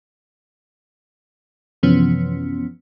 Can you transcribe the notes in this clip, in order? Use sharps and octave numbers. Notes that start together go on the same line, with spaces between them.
F#2 C3 E3 F3 B3 C#4